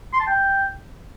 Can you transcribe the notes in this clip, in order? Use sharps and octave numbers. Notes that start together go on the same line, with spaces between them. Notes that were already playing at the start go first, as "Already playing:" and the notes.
C6
A5
G5